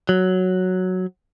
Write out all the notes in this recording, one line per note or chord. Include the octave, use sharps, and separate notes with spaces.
F#3